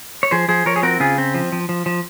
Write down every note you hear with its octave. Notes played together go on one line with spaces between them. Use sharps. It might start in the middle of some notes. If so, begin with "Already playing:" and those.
C#5
F3 G#4 C5
F3 G#4 C5
F3 A#4 C#5
G#4
C4 F#4 A#4
C#3 F4 G#4
C4
F3
F3
F3
F3